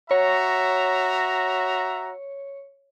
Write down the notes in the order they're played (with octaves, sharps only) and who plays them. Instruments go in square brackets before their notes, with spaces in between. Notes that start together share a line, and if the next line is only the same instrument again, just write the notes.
[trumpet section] F#4 E5 A#5 [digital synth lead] C#5